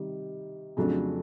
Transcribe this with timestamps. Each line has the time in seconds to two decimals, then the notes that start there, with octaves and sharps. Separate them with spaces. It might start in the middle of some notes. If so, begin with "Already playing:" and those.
Already playing: C3 D#3 G3
0.77 F2 C#3 F#3 A3 D4